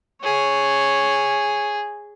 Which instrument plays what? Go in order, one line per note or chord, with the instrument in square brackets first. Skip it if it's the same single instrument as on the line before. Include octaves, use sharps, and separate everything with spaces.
[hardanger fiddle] G#4 [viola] C#5